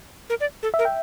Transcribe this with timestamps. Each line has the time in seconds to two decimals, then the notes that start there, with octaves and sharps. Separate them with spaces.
0.30 A#4
0.40 D5
0.63 A4
0.74 E5
0.79 A#4
0.85 G5